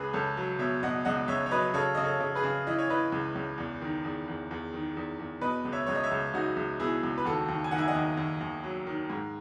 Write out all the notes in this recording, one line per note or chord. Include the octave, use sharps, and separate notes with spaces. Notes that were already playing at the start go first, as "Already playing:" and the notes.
Already playing: C#2 G#4 B4
C#2 A4 C#5
F#3
B2 C#5 E5
B2 D#5 F#5
C#2 D#5 F#5
C#2 C#5 E5
C#5
F#3 B4 D#5
C#3 A4 C#5
C#3 D#5
A4 C#5
C#3
G#4 B4
C#3
E3 D#5
C#5
E3 B4 D#5
C#2
C#2
E2
D#3
E2
E2
E2
D#3
E2
E2
B2 B4 D#5
C#2
C#5 E5
C#2 C#5
D#5
C#5 E5
C#2
C#2 D#4 F#4
C#2
B2 E4 G#4
C#2
B4
D#2 F#4 A4
D#2
G#5
D#3 F#5
E5 G#5
D#5 F#5
D#2
D#2
D#2
F#3
D#3
G#2